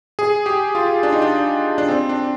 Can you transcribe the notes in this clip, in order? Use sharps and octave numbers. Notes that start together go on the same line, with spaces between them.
G#4
G4
F4
D4
D#4
D4
D4
C4
D4